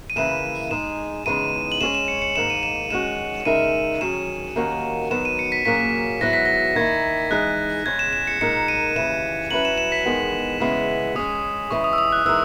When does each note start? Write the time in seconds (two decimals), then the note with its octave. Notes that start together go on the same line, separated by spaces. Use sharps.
0.10 D#7
0.16 C#3 E3 A#3 E4 B4 E7
0.71 G#3 D#4 G#4 E7
1.26 E2 C#3 G#3 B3 D#4 D#7
1.72 F#7
1.81 G#3 C#4 G#4 C#5 E7
1.95 E7
2.08 C#7
2.22 C#7
2.36 G#2 D#3 A#3 E7
2.50 D#7
2.63 E7
2.90 D#3 G#3 C#4 F#4 E7
3.45 C#3 G#3 D#4 A#4 E5 D#7
4.01 D#3 F#3 C#4 G#4 E7
4.56 D#2 D#3 A#3 C#4 F#4
5.11 D#3 F#3 B3 E7
5.25 D#7
5.39 C#7
5.52 B6
5.65 A#2 F#3 A#3 C#4 G#4 B6
6.21 G#2 F#3 B3 E4 A#6
6.33 B6
6.46 A#6
6.76 D#3 A#3 E4 G#6
7.31 E3 G#3 D#4 G#4 D#5 F#6
7.86 E2 C#3 G#3 C#4 G#6
7.99 E7
8.13 E7
8.27 C#7
8.41 A#2 G#3 D#4 A#4 C#7
8.68 D#7
8.96 D#2 C#3 E3 E7
9.51 F#3 C#4 E4 B4 F#7
9.65 E7
9.78 E7
9.92 B6
10.06 E2 D#3 G#3 B3
10.60 E2 C#3 G#3 B3 E4
11.15 G#3 C#4 G#4 D#6
11.71 C#3 E3 G#3 C#6
11.84 D#6
11.93 E6
11.98 D#6
12.12 F#6
12.25 E3 G#3 D#4 A#4 E6